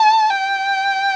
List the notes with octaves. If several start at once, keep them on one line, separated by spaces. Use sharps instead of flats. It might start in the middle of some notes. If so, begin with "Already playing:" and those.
Already playing: A5
G5